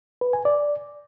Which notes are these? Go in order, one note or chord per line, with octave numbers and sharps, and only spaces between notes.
B4
G#5
D5